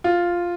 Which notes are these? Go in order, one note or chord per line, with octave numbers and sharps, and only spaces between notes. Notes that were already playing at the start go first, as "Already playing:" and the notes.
F4